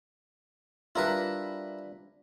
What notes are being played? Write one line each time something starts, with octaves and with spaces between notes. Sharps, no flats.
G3 D4 E4 F4 A#4 B4